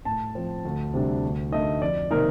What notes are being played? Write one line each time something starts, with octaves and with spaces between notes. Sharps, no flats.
A2 A5
F3 C4
D2
C3 G3 D4
D2
D3 A3 D#4 D#5
F2 D5
C3 D#3 A#3 D#4 A#4